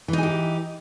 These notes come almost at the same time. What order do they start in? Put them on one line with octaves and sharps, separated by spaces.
E3 D#4 G#4 G4